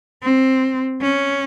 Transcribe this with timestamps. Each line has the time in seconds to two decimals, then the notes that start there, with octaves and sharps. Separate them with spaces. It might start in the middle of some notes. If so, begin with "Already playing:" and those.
0.23 C4
1.01 C#4